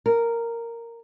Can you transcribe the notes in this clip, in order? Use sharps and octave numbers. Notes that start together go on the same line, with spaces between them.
A#4